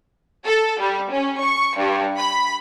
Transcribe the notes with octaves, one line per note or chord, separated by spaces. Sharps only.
A4
G3
C#4
C#6
G2
B5